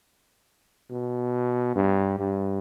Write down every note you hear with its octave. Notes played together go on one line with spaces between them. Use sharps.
B2
G2
G2